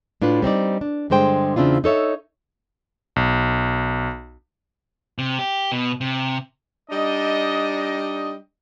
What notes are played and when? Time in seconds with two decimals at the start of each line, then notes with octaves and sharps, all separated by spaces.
0.22 A2 D4 F4 B4
0.42 G3 C4 D#4 D5
0.81 D4
1.10 G2 D3 G#3 C5 G5
1.56 E2 C#3 C4 D4 E4 F4
1.84 D#4 A4 C#5 E5
3.16 B1
5.18 C3
5.39 G4
5.72 B2
6.01 C3
6.90 G3 D4 D#4 D#5